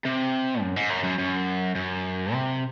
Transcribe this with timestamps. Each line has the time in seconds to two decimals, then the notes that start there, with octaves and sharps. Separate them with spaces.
0.05 C3
0.61 F#2
0.76 G#2
0.90 F#2
1.04 F#2
1.19 F#2
1.75 F#2
2.33 C3